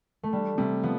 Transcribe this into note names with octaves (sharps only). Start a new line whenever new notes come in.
A3
G3 D4
C3 G3
F3 B3